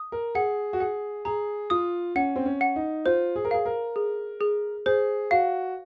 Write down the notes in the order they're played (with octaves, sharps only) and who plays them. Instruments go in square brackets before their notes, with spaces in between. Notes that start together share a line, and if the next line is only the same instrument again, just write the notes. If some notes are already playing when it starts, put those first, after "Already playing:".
Already playing: [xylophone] D#6
[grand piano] A#4
[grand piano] G#4 [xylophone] F#5
[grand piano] F#4
[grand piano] G#4 [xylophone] F#5
[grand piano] G#4 [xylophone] A#5
[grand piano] F4 [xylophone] D#6
[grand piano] C#4 [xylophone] F#5
[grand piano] C4
C#4
[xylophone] F#5
[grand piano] D#4
[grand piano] F4 [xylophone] C5
[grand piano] G#4
A#4
[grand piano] G#4 [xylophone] F5
[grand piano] A#4
[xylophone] G#4
G#4
[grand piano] G#4 [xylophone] C5
[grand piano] F#4 [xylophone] F5